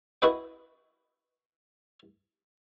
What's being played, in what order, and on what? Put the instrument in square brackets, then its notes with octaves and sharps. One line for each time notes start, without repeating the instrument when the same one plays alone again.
[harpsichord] E4 F#4 B4 D#5 G5